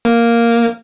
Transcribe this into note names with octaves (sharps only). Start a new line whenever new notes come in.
A#3